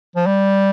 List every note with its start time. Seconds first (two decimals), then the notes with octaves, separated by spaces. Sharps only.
0.16 F3
0.27 G3